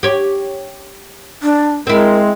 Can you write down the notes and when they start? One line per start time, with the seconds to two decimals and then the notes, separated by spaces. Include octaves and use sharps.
0.03 G4 C#5
1.42 D4
1.87 G#3 C4 E4 A#4